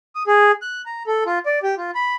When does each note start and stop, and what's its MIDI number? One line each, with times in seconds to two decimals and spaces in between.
0.15 0.23 87
0.27 0.52 68
0.62 0.82 90
0.86 1.03 82
1.07 1.24 69
1.26 1.39 65
1.46 1.59 74
1.63 1.75 67
1.77 1.91 65
1.95 2.16 83